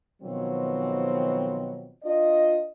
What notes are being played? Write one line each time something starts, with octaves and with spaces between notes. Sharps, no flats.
B2 D#3 F3 F#3 C4
D4 F4 D#5